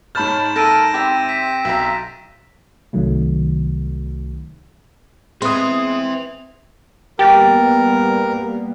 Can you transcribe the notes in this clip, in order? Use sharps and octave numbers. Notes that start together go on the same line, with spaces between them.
G#2 C#5 A5 B5 F6 G6 A6 E7
A#3 A4 A#4 A#6 D7 D#7
C4 G4 E5
B6
B1 E5 A#5
C2 C3 D#3 F#3 A3
G#3 B3 C4 B4 E5 C6 D#6
G3 A#3 B3 G4 A#4 G5 A6